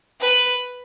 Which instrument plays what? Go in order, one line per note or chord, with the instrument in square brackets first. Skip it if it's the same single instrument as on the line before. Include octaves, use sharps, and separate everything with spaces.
[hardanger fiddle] B4